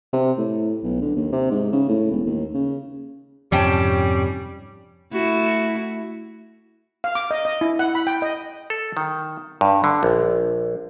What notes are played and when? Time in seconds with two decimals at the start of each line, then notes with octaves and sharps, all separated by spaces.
0.13 C3
0.38 A2
0.84 B1
1.02 D3
1.16 D#2
1.32 C3
1.51 G#2
1.73 C#3
1.89 A2
2.11 E1
2.26 D#2
2.54 C#3
3.52 F2 G#2 C3 G3 C#4 G5 A5
5.11 A3 E4 F#4
7.04 F5
7.15 D6
7.31 D#5
7.45 D#5
7.61 E4
7.79 F#5
7.95 B5
8.07 G5
8.22 D#5
8.70 A4
8.97 D#3
9.61 G2
9.84 D3
10.03 A#1